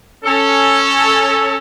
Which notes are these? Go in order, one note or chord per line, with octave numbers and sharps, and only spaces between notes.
C#4 A4